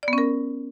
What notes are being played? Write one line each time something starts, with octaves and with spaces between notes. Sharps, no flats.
B3 C#4 A#4 D5